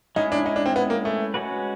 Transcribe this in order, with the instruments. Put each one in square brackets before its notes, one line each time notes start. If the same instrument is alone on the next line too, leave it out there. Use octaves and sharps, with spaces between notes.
[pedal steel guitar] G#3 C#4 E4 G#4 [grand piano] D#4
[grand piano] D4
D#4
D4
C4
B3
A#3
A3
[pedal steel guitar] G#3 C#4 F#4 B4